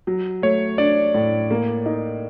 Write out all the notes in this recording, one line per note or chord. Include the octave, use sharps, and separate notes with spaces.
F#3
A3 C#5
D4 D5
A2
A#3
D#4